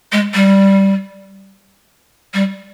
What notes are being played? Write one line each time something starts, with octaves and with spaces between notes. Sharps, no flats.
G#3
G3
G3